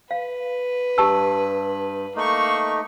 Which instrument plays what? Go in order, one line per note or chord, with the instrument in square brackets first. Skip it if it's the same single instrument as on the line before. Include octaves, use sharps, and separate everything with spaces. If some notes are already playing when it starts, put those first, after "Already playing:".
[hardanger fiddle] B4 [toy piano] F5
[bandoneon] G2 [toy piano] G4 A5 E6
[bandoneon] A3 D#4 [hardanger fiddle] A#3 C#6